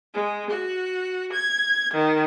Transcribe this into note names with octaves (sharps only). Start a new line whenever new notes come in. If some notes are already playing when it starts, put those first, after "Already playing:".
G#3
F#4
G#6
D#3